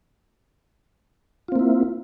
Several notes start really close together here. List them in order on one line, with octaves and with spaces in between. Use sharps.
F4 C4 A#3 E4